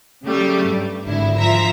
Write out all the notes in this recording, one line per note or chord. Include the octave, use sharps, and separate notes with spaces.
C#3 F#3 G3 A3 G4
G2
G#1 D3 E4
F3 E5 A#5 B6